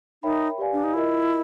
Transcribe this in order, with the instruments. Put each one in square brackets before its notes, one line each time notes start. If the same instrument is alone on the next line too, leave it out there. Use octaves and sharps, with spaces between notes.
[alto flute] D#4 [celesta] A#4 C#5 E5 G5 B5
[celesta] G4 B4 D5 F5 G#5
[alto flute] D4
D#4
[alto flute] E4 [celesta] F4 A#4 D#5